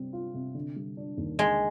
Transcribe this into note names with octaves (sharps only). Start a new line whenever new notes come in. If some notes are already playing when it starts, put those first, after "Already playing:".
Already playing: C3 G3 C4
F4
C3
D3
G3
D4
D#2
D3 G#3